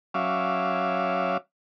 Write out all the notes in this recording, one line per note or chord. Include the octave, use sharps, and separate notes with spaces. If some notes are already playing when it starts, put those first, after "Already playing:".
F#3 C#4 E5 F5 D6